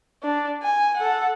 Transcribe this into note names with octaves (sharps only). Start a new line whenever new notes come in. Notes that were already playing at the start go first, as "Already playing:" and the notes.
D4
G#5
A4 F#5